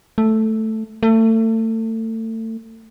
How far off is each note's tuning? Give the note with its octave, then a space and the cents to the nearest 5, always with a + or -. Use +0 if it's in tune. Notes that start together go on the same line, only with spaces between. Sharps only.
A3 +0
A3 +30